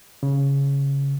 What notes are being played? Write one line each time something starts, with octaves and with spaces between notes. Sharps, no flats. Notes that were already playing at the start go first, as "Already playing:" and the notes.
C#3